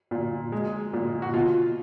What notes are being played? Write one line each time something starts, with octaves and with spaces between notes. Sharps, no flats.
A#2
G#3
A#2
F#4
B2 F4